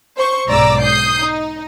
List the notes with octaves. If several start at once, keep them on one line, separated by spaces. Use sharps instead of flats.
C5 C#6
B1 G#2 D5 A#5 D6 E6
D#6 G6 C7
D#4